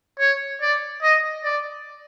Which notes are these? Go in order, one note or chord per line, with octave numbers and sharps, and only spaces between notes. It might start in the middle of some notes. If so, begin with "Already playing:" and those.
C#5
D5
D#5
D5